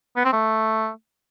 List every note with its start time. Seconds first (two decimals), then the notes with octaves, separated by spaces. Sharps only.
0.16 B3
0.25 C4
0.33 A3